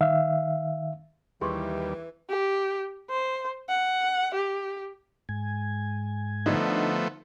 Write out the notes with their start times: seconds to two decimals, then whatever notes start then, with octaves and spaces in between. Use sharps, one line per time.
0.01 D#3 E5 F5
1.41 D#2 E3 G3 G#4 C6 C#6
2.29 G4
3.10 C5
3.69 F#5
4.34 G4
5.29 G#2 G#5
6.46 D3 F3 A3 B3 D4 D#4